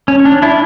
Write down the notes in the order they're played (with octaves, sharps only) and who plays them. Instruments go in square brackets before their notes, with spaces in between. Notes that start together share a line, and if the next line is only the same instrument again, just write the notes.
[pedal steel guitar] C#4
D4
D4 E4